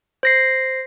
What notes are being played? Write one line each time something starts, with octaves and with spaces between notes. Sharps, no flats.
C5 A#6 C7